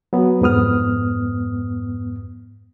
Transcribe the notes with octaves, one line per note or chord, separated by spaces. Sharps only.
F#3 B3
F2 G#2 B3 D#6 F6